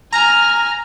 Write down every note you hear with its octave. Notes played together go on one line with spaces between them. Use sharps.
G#5 A#5 F6